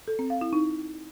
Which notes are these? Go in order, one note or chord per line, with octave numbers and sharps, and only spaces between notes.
A4
C4
F5
E4
D#4